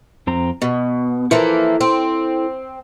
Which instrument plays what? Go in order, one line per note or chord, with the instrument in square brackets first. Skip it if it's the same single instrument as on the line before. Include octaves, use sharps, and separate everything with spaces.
[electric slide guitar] F2 C4 A#5
[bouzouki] B2 [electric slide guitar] B3
[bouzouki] E3 F3 A#3 [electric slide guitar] E4 A4
[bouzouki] C4